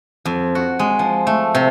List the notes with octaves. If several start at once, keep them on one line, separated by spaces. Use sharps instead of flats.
F2
F#4
G#3
F3
A3
C3